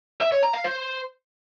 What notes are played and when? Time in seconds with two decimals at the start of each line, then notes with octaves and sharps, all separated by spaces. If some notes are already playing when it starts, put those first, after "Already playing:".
0.21 E5
0.32 C#5
0.43 A#5
0.54 F5
0.65 C5